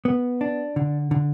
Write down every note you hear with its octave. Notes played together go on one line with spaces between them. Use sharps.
B3
D4
D3
D3